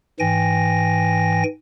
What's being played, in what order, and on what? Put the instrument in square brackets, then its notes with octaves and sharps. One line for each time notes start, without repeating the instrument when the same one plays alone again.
[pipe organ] G#2 E3 G5 G#5 A#6